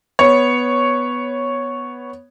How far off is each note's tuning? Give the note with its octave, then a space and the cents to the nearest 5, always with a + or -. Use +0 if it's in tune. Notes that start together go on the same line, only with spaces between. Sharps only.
B3 +0 C#5 +0